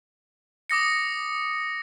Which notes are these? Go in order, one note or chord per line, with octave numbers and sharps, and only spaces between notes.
D6 D#6 A#6 C#7